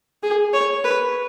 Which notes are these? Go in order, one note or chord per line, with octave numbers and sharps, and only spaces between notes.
G#4
C#5
B4